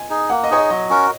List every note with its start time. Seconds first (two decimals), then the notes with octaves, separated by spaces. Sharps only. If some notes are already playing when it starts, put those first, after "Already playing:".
Already playing: D#5 G#5
0.10 D#4 G#4
0.30 A#3 F#5
0.44 D#5
0.50 D#4 G#4 C#5
0.57 D#5
0.70 F#3 D#5
0.90 C#4 F#4 A#4